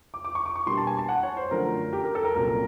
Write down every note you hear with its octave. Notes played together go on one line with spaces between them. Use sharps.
D6
D6
C#6
D6
C#6
B2 G3 A#3 D4 C6
A5
G#5
A5
F#5
C#5
C5
F#2 D3 F3 A3 D4 A#4
G4
A#4
A4
A#4
C2 A#2 F#3 A#3 C#4 A#4